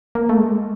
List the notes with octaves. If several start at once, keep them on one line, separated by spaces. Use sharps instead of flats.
A#3
A3
G#3